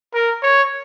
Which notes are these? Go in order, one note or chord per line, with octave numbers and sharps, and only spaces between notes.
A#4
C#5